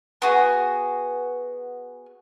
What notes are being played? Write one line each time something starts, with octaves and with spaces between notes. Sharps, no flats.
B3 F#4 G#4